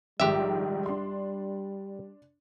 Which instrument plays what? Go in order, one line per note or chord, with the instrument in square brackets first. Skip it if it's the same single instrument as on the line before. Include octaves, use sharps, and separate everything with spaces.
[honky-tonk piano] A#1 G#2 D#3 [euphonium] G3 [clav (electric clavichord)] G4 E5
[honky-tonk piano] D4 C6